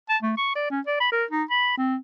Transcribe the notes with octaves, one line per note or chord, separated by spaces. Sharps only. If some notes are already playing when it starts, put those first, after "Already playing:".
A5
A3
C#6
D5
C#4
D5
B5
A#4
D#4
B5
C4